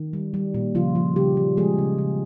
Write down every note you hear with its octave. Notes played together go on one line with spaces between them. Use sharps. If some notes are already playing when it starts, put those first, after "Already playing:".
Already playing: D#3
G3
G3
A#2
C#3 F3 F4
F3
C#3 G3 G4
F3
F3 G#3 G#4
C#3
C#3